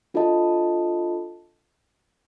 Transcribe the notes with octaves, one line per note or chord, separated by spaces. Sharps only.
D4 F4 A4 D#5 A5